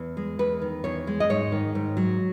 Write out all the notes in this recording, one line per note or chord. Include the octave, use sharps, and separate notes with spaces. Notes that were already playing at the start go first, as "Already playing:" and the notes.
Already playing: E2
G#3
E2 B4
D#3
E2 C#5
G#3
D#5
G#2 C#5
D#3
G#2
F#3